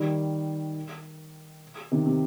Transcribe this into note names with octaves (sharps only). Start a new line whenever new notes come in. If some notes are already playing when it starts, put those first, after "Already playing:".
Already playing: D#3 G3
C3 D#3
C3